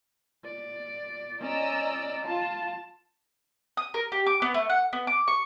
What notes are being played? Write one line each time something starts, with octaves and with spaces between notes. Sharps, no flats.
D5
C#4 D5 D#5 A#5 E6
F4 A5
D#6
A#4
G4
D6
B3
A3
F#5
B3
D6
C#6